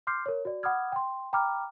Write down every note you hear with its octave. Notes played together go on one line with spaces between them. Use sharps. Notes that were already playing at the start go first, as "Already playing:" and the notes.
C6 D6 F6 G6 C7
A#4 C#5
F#4 D5
F#5 B5 D6 D#6 F6 G#6
G5 C6
G5 A#5 B5 D6 F6